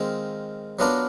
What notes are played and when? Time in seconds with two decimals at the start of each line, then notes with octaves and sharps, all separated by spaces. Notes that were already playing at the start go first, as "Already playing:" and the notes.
Already playing: D#3 G#3 C4 F4
0.79 F#3 B3 D4 F4 A#4